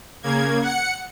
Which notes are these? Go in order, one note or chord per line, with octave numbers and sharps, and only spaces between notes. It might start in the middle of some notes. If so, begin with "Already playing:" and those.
C#3 A#3 G#6
F#5 C#7